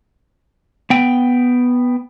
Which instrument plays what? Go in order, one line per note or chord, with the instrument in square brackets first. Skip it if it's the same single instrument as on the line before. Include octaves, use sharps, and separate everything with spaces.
[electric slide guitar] B3 G5